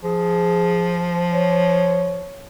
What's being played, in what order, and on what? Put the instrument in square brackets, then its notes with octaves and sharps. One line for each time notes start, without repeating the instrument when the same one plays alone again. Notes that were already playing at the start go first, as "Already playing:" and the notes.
[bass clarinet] F3 [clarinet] G#4
[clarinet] C#5